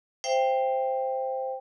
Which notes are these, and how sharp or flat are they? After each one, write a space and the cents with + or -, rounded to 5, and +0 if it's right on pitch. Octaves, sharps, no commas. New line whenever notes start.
C5 +0 E5 +40 G5 +5